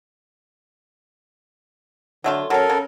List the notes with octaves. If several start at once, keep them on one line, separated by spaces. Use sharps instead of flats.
D3 F#3 A3 F4
F#3 C#4 A4 A#4
C#3